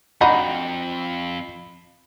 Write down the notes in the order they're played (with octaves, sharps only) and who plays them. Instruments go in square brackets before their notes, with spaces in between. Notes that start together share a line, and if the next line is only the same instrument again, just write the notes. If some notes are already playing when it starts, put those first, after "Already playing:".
[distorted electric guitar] F2 [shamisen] D4 D#4 F#4 [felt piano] B5